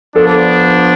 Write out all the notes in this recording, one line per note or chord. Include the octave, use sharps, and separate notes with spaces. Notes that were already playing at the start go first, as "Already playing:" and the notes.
F3 B3 D4 A4